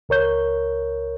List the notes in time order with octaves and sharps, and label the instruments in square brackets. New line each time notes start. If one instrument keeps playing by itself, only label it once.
[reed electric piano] C#2 A#4 C#5 G6